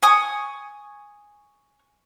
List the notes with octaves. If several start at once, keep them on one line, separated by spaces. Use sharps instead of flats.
G#5 C#6 D#6